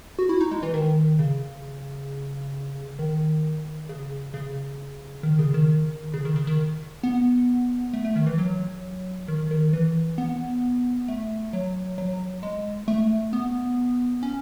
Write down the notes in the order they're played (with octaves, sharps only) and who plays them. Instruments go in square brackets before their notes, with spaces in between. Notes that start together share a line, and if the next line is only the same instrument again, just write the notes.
[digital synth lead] F#4
E4
D#4
G#3
E3
D#3
C#3
D#3
C#3
C#3
D#3
C#3
D#3
C#3
D#3
C#3
D#3
B3
A3
A3
D#3
E3
F#3
D#3
D#3
E3
B3
A3
F#3
F#3
G#3
A3
B3
C#4